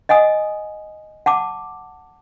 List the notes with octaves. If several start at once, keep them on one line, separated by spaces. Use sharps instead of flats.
D#5 F#5 G#5 D#6
F#5 A5 D6